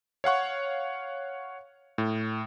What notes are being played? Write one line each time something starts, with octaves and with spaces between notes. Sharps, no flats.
C#5 F5 F#5 C#6
A2